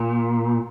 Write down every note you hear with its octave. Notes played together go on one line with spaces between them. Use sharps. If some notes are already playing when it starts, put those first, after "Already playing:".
Already playing: A#2